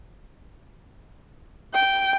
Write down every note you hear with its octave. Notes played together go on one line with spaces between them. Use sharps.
G5